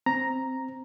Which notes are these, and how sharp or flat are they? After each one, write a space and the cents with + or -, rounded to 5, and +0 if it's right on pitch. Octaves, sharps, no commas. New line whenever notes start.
C4 +0 A#5 +0